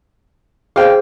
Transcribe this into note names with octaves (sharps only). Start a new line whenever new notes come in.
G#4 C5 F5 G5